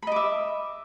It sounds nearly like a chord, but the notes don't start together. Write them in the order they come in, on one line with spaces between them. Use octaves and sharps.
B5 D#5 D6 E5